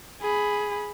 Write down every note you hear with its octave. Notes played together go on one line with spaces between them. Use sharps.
G#4 B5